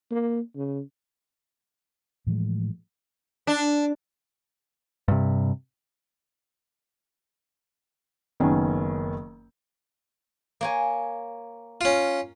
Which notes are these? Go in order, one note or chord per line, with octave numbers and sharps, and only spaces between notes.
A#3
C#3
A2 E3 F3 G#3
D4
G2 C3
F#1 D#3 B3 C#4
A#3 C#5 G#5
C#4 F4